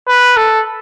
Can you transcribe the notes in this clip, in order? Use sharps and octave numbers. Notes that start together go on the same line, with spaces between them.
B4
A4